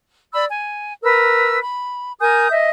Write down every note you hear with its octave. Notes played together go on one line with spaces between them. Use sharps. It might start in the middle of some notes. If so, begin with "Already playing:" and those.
D5 B5 E6
G#5
A#4 B4 E6
B5
A#4 G#5 D#6 G6
D#5 E5